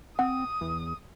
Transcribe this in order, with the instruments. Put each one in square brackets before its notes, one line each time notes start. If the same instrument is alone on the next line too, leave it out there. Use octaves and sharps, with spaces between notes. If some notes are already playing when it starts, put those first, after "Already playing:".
[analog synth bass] C4 [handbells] F#5 [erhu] D#6
[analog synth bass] E2